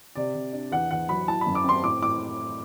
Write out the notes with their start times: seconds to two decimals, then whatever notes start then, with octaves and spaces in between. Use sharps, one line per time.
0.15 C3 D5
0.35 C3
0.53 D4
0.71 E2 F#5
0.91 E2 F#5
1.09 F#3 B5
1.28 E4 A5
1.41 B5
1.47 F#2
1.55 D6
1.64 C4 C6
1.83 A2 D6
2.02 A2 D6